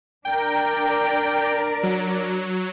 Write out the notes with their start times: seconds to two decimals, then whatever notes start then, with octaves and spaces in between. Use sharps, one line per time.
0.25 D4 A#4 D5 G5
1.83 F#3